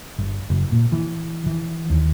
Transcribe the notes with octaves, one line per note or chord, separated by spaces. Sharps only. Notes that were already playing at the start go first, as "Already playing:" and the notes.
G1
F#1
A#2
E3
E3
D#2